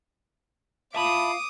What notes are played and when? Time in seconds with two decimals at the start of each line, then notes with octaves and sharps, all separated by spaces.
0.95 F4 E5 F5 A5 B5 D6 D#6